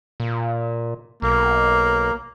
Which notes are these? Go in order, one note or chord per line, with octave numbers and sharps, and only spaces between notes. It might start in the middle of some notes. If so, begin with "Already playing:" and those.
A#2
B1 A#3